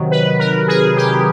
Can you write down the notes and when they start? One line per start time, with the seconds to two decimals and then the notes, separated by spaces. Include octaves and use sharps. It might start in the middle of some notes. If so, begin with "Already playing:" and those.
Already playing: C3 D#3 F#3
0.11 B4
0.39 A#4
0.68 G#4
0.97 G4